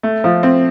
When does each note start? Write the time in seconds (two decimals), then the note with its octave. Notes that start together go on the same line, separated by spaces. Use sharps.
0.03 A3
0.24 F3
0.43 C4